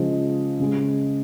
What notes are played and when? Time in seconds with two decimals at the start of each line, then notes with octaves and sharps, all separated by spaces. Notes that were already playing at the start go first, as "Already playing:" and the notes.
Already playing: C#3 F3 G#3 C5 D#5
0.60 C#3 G#3